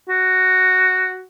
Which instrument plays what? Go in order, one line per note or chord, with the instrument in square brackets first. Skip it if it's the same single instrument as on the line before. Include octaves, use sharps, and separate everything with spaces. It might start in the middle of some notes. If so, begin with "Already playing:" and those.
[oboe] F#4